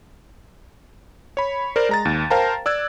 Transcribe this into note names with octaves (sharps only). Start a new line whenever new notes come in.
C#5 B5
A#4 C5 D5
G#3 A#5 A6
D#2
A#4 C5 F5 G5 A5 A#5
D5 E6 F#6 G#6